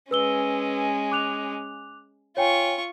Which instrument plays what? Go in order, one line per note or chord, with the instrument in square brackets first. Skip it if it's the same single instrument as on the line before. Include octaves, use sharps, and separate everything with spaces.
[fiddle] G#3 C#4 [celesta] B4 E6 G7
[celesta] D6 F#6 F7
[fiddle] F4 C#6 [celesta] C#5 G5 G#5